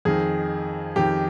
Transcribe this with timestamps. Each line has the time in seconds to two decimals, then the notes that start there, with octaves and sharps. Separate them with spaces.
0.05 F2 D#3 G#4
0.96 F2 D#3 G4